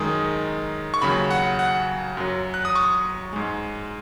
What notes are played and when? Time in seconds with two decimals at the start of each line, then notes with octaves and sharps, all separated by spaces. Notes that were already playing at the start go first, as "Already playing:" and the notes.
Already playing: F#2 D#3 G#3 D#6
0.94 C#6
1.01 D#2 C#3 F#3 B5
1.31 F#5
1.59 F#5
2.17 F#2 F#3
2.54 F#6
2.65 D#6
2.75 C#6
3.33 G#2 G#3